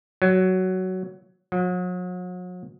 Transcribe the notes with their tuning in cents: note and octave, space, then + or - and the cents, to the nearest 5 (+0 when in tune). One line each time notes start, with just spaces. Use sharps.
F#3 +10
F#3 -40